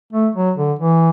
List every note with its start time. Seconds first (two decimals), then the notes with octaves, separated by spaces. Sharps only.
0.13 A3
0.35 F#3
0.57 D3
0.79 E3